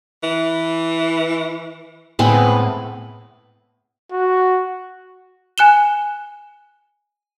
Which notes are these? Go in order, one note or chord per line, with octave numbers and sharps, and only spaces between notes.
E3
A2 G#3 B3 C4 B4
F#4
G#5 F#6 E7 G7